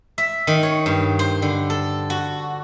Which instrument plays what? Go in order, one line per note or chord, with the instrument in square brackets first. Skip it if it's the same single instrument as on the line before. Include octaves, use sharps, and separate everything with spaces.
[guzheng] E5
D#3
C#5
G2
C5
D3
A4
F#4